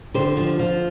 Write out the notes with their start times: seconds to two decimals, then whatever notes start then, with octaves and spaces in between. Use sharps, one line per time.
0.14 D3 G4 C5
0.37 F3
0.59 F3